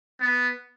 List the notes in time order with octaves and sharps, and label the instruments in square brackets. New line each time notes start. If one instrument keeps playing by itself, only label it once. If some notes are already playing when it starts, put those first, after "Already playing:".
[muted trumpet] B3